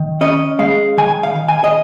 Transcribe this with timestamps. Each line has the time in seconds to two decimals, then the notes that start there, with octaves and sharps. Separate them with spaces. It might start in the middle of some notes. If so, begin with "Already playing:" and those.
Already playing: D#3
0.21 C#4 D#5
0.59 G#3 F5
0.98 D#3 G#5
1.23 F5
1.36 D#3
1.48 G#5
1.64 D#5